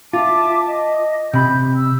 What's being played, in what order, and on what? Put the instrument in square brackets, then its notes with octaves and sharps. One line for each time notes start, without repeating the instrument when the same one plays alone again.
[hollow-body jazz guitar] F4 [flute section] E5 A5 D6
[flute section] D#5
[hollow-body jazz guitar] C3 B5 [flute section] G6
[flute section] E6